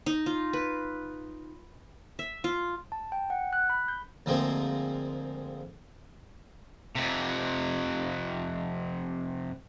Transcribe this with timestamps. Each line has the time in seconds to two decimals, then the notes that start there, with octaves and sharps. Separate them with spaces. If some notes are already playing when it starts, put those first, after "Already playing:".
0.06 D#4
0.26 F4
0.53 B4
2.19 E5
2.44 F4
2.92 A5
3.12 G5
3.30 F#5
3.53 F#6
3.70 B5
3.88 G6
4.26 D2 F3 G#3 A#3 C4
6.96 F2 C3